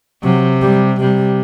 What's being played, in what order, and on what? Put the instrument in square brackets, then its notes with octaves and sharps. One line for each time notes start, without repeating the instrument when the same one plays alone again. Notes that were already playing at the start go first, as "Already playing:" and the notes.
[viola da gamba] C3 [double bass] F#3
[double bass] G3
[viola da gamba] C3 [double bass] G3